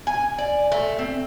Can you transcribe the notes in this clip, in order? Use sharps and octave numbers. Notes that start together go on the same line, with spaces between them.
G#5
D5
A3
C4